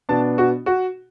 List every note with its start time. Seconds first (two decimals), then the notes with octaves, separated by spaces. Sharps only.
0.09 B2 B3 D4 A5
0.38 F#4
0.66 F#4